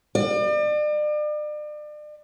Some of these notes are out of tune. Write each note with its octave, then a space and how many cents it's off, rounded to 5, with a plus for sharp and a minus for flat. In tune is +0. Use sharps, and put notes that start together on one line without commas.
D5 +40